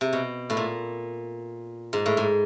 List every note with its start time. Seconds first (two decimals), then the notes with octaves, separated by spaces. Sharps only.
0.01 C3
0.13 B2
0.50 A2
0.57 A#2
1.93 G#2
2.06 A2
2.17 G#2